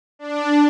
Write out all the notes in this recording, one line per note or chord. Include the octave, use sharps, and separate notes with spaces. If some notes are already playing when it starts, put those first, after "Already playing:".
D4